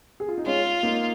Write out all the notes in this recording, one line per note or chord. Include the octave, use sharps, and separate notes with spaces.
G#4
F4
D#4
G#3 C#4 F4
A#3 D#4